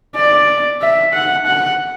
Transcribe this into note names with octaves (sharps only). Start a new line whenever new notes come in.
D5
E5
F#5
F#5